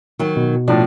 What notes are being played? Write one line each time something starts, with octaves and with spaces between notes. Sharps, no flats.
D#3 F#3
B2
A2 F3 D4